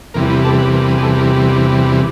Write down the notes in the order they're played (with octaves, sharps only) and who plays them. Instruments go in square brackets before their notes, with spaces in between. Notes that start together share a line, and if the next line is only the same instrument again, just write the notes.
[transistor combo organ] E2 C3 E3 G3 A#4
B4
A4
B4
A#4
B4
G#4
A4
A#4